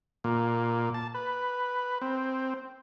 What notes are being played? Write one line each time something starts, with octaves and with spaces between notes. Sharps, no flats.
A#2
A5
B4
C4